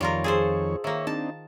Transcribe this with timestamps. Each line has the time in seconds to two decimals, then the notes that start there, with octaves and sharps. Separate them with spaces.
0.01 F2 D#3 G3 F4 A#4 C#5
0.24 G#4 A4 C5
0.84 D#3 A#3 C#5 E5
1.07 C4 D4 D#4 A5